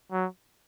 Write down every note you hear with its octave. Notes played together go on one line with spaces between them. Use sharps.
F#3